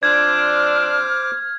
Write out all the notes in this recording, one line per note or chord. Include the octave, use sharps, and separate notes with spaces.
F3 C4 D4 C5 D6 F6 G#6